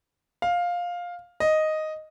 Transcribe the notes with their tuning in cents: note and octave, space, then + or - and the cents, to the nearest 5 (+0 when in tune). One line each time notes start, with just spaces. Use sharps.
F5 +10
D#5 +0